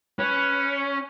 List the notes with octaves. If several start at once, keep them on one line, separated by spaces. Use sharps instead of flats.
C#4 B4